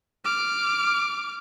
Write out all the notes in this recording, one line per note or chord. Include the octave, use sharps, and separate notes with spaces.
D6 F6